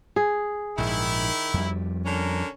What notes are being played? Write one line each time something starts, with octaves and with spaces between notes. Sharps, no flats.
G#4
A#1 G#2 D#3 E4
F2 G3
D3 C#4 A#4